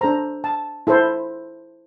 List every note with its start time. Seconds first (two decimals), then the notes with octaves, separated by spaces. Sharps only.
0.01 D4 A4 C5 A#5
0.44 A5
0.87 E4 A4 C5